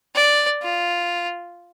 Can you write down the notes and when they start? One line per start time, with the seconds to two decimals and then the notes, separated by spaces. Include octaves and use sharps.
0.15 D5
0.62 F4